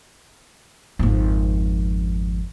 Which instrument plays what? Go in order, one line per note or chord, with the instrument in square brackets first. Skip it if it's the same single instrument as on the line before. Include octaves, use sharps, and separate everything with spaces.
[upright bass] G#1 F2